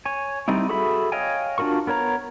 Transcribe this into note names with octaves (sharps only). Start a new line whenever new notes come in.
C#5 G#5
G3 C4 D#4 E4
F#4 G#4 A4 E5 B5
C#5 D#5 F5 G5 G#5
D4 F4 F#4 A#4 C#6
B3 A#4 C#5 A#5